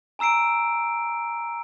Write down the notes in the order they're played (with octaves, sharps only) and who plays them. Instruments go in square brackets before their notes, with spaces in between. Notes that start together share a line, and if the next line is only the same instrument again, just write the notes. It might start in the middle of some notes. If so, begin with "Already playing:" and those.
[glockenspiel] G#5 A#5 E6 C7 D7